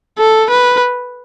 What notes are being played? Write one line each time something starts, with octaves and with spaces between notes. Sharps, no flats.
A4
B4